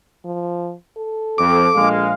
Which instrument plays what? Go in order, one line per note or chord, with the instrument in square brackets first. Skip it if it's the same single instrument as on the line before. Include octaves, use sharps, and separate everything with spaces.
[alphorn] F3
A4
[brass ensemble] F2 [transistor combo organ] D6
[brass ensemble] A#1 G#3 F5